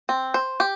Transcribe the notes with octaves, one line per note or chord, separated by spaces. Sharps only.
C4
C5
G4